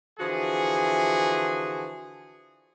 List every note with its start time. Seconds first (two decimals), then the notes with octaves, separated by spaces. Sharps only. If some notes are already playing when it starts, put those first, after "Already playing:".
0.19 D3 E3 F3 F#4 G#4